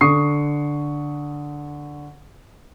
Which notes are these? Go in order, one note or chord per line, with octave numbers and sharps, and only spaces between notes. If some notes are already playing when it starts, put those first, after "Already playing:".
D3 C#6 D#6 C7